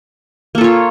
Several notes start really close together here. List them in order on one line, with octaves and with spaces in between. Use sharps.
A#3 A4 F4 C#5